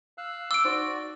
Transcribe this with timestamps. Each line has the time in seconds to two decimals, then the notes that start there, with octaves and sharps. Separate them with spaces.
0.18 F5 E6 F#6
0.51 D6 E6 D7 G7
0.65 D#4 F#4 C5 D5 C6